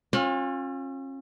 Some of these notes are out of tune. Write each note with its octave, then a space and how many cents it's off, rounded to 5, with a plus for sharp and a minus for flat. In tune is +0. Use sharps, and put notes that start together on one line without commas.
C#4 -40 F4 +30